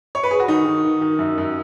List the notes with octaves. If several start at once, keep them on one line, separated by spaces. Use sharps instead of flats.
C#5
B4
G#4
F#4
D#3 D#4
D#3
D#3
D#3
F#2
F#2